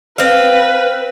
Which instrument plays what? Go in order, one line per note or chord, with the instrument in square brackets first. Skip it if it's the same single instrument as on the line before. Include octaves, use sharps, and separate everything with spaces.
[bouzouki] C4 F5 [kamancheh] B4